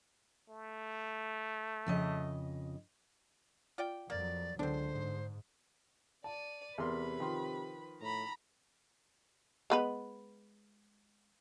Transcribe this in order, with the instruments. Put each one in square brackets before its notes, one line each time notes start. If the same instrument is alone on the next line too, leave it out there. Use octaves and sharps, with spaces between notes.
[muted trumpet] A3
[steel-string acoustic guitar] F2 C#3 D#5
[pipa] F4 D5 G5
[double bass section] F2 F#3 [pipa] A#3 [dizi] D5
[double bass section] C#2 [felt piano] D3 [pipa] C4 D4 [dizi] C5
[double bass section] G#2
[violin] D5 D#7 [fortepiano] A5
[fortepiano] E2 A#4 C6 [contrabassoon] C3 [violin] B4 B5
[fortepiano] D#3 F3 C6
[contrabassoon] A2 [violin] A#5 B5
[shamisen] G#3 B3 B4